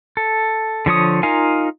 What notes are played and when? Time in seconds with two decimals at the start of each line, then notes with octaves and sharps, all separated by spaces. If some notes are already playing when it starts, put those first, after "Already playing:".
0.17 A4
0.86 D3 F3 C#5 D#6
1.23 D#4 F4 A#4 F5 G#5